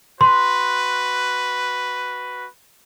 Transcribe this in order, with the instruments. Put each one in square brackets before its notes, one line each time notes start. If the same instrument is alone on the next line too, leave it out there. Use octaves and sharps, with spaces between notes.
[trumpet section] F#4 B4 [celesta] C6